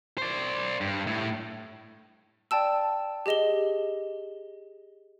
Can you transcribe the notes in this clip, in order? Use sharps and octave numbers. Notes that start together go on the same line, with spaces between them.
C5 D5
G2
A2
D5 G5 A5 E6
G4 G#4 D#5 E7 G7